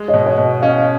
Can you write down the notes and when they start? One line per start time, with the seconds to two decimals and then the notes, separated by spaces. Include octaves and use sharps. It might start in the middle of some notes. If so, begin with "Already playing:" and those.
Already playing: G#3
0.08 C#5 D#5
0.14 B2
0.26 C#5 D#5
0.38 B2
0.62 C#4 D#5 F5